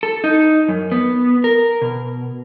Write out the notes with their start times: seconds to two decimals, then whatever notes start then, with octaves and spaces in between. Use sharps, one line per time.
0.03 A4
0.24 D#4
0.68 F#2
0.92 B3
1.44 A#4
1.82 B2